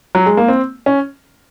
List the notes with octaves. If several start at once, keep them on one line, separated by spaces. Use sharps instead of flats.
F#3
G#3
A#3
C4
C#4